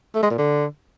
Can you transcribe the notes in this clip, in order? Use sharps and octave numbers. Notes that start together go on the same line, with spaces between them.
A3
G#3
A#2
D3